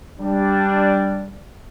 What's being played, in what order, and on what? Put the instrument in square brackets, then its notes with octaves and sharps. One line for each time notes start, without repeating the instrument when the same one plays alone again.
[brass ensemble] G3 D4